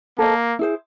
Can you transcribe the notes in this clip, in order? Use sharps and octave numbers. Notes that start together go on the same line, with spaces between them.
A#3 A4 C5 D#5
E4 G#4 C5